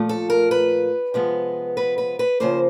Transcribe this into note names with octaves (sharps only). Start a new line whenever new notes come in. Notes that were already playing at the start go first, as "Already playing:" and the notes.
Already playing: A#2 F3 A3
A4
A#4
B4
C3 F3 G#3 B3
B4
B4
B4
C#3 F3 A#3 C5